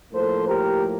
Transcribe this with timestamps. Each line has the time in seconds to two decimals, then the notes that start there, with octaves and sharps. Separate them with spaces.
0.12 A2 F3 A#3 A4 C5
0.47 G4 A#4